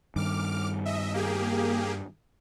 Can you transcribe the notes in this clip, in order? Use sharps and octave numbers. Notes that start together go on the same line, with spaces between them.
G2 D#3 D6 F6
D#5 E5
A#3 G4 G#4